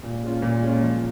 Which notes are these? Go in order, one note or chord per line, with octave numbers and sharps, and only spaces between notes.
A#2
G#3 C#4 F4
A#2
G#3 C#4 F4
F3